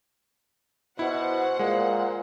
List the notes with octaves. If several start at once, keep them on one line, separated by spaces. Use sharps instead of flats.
B2 E4 C5 F#5
A#2 G#3